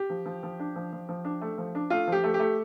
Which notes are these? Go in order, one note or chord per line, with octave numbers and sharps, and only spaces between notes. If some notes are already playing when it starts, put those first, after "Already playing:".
Already playing: G4
F3
F3
F3
D4
F3
F3
F3
D4
A3
F3
D4
A3 F4
F3 G4
A3
G4
A3